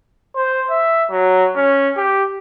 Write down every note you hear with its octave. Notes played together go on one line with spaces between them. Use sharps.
C5
E5
F#3
C#4
G4